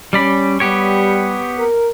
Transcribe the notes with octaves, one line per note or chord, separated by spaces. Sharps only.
G3 C#4 D5 B5
G3 B3 G4 C#5
A#4